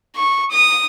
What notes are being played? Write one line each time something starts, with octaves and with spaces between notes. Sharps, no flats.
C#6
D#6